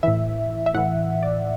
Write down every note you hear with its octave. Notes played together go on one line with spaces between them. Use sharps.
A2 E3 E5
E5
A2 E3 F#5
D5